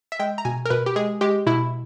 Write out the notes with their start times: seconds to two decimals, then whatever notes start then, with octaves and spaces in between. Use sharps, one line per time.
0.12 E5
0.19 G#3 G5
0.38 A#5
0.45 B2 G#5
0.65 A#4
0.70 B2 B4
0.86 G4
0.96 G#3 G#4
1.21 G#3 G4
1.46 B2 E4